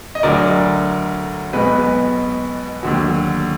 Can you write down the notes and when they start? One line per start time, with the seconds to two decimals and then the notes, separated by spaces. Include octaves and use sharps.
0.15 D#5
0.23 D2 D3 F#3 A#4 D5
1.53 B1 B2 G#3 B4
2.83 D#2 D3 F#3